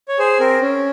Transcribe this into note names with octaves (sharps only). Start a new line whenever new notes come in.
C#5
G#4 C5
C4 A#4
C#4